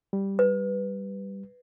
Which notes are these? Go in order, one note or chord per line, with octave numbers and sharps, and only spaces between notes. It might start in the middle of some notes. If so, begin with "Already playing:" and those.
G3
B4